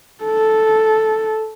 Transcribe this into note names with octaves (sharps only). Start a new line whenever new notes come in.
A4